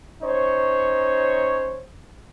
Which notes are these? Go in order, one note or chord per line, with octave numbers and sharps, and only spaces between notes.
C#4 D#4 C5 C#5